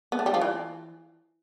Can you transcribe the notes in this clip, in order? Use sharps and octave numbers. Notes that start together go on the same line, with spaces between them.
B3
A3
G3
F3
E3